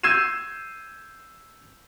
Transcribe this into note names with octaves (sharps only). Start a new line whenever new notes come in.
E6 G6 G#6 C7 D#7 E7